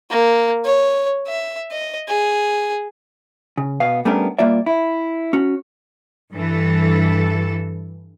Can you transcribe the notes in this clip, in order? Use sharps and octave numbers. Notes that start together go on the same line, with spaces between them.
A#3
C#5
E5
D#5
G#4
C#3
B2 B3 F5
G3 A3 B3 C#4 D4 A#4
G3 A#3 F4 D5 E5
E4
C#4 F#4
G2 E3 A4